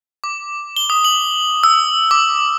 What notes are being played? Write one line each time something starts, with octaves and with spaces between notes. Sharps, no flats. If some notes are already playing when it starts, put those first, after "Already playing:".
D6
G7
D#6
F#7
E6
D6